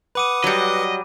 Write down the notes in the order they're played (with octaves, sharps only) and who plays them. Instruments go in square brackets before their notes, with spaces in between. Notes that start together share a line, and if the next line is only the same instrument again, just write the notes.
[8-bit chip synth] B4 F#5 D#6 [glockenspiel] B5 D6 D#7
[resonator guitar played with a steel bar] F#3 G3 [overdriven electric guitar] D#5